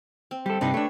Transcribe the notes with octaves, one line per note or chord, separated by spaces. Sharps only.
C4
G3 G4 A4
G2 C3 D4 D#4 B4
A3 D4 C#5 E5